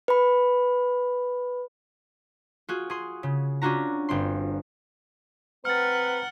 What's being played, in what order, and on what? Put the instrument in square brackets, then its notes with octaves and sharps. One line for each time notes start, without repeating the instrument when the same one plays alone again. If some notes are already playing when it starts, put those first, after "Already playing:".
[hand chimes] B4 B5
[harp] F4 F#4 G#4
G#4 C6
C#3
C#4 D4 F4 F#4 A#5
G1 C4 C6
[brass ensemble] C4 A#5 [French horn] B4 [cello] F#5 [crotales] F6 A6